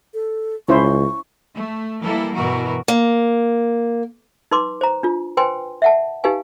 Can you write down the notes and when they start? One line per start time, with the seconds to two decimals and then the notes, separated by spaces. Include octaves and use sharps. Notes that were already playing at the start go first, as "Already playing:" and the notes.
0.14 A4
0.68 C#2 C#4 E4 C5 C#6
1.53 A3
2.03 E3 G3 A#3 E4 A4
2.34 G2 B2 E3 F#4 A#4
2.88 A#3
4.51 D#4 B4 C6 D6
4.81 C5 A#5
5.03 D4 F4
5.37 B4 C5 G5 G#5 C6
5.82 E5 F#5 A5
6.24 D#4 G4 B4 F5 G#5